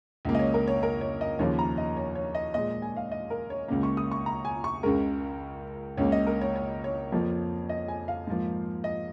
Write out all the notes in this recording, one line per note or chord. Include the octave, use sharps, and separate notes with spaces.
C#2 C#3 A#3
D#5
C#5
A#4
C#5
A#4
C#5
D#5
D#2 C#3 F3 A#3 C#5
A#5
D#5
C#5
C#5
D#5
A#2 G#3 D#5
G#5
F5
D#5
A#4
C#5
C#2 C#3 A#3
C#6
D#6
C#6
A#5
G#5
C#6
C#2 C#3 G#3 A#4
C#2 C#3 A#3 C#5
D#5
A#4
C#5
C#5
C#5
F2 F3 A#3
D#5
G#5
F5
G#2 F3 A#3
D#5